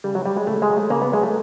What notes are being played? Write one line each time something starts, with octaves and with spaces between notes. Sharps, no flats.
C#3 G3
F#3
F#3 G3
G#3
C#3 A3
G#3
F#3
A3
C#3 A#3
B3
F#3 G#3
A3